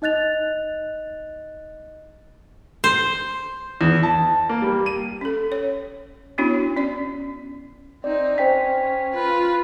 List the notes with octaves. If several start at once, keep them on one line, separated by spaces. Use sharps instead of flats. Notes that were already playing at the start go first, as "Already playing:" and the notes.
D#4 D#5 F#6 A6 F7
C5
E2
A5
A#3
G3
D#7
C#4 A4
C#5
B3 C#4 D4 E4 F#4 C#5
C#4 D5
C4 D#4 D5
C#4 C5 G5 B6
F4 B4